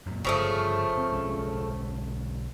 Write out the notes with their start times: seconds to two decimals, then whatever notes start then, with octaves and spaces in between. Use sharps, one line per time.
0.06 F#2 A#2
0.24 G1 C#3 F3 A3
0.97 C4
1.12 B1 G#3 C#4